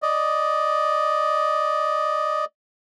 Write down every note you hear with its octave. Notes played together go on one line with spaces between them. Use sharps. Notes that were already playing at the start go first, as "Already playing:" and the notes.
D5 D#5